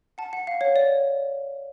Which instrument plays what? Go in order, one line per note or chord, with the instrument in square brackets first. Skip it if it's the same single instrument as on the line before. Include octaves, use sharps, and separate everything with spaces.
[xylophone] F#5 A5
F#5
F5
C#5
D5